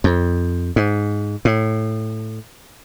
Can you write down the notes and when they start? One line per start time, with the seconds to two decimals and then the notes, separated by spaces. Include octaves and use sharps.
0.04 F2
0.76 G#2
1.45 A2